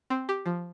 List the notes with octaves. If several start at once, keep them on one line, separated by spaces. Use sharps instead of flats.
C4
G4
F3